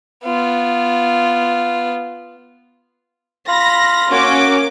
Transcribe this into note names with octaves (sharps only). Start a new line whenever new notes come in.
B3 F4
F4 F5 B5 A#6
A#3 C#4 F#4 C#5 D6